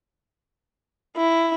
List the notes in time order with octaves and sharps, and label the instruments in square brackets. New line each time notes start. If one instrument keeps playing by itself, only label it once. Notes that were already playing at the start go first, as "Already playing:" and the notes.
[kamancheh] E4